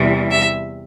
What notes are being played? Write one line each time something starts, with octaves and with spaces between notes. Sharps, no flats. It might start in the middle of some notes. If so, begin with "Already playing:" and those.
Already playing: E2 C3 E3 G3
E5